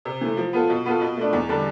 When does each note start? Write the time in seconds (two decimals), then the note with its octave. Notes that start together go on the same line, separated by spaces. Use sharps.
0.05 C3
0.21 E3 A3
0.37 F3
0.53 B3 F4 A4
0.69 B2
0.86 B3 F4 A4
1.01 B2
1.17 A3 D4
1.33 E2
1.49 D3 G3 D4 A4